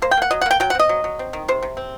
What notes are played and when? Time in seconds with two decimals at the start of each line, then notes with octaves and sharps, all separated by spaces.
0.02 A#3 C5
0.11 G5
0.17 A#3 F#5
0.31 F#3 D#5
0.41 F#5
0.46 A#3 G5
0.60 F#3 G5
0.70 F#5
0.75 C4 D#5
0.89 F#3
1.04 F#3
1.19 C4
1.33 D#3
1.48 C3 C5
1.62 C3
1.77 C4